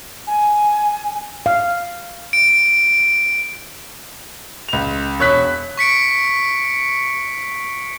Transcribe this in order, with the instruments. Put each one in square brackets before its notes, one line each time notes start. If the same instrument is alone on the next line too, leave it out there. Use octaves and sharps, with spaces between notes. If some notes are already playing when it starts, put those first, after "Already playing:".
[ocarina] G#5
[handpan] F5
[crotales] D7
[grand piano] C#2 F7
E1 C#5 B5 F#6 B6
[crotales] C#6 B6 C#7 D7